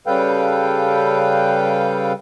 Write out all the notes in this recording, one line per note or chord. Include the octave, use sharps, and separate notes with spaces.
C#3 G3 A4 B4 F5 G5